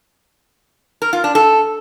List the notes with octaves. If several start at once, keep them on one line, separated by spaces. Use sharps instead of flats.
A#4
F4
D4
A4